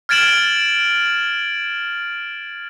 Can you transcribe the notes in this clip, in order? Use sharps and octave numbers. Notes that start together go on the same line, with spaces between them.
F6 G#6 A6 D7 E7 F#7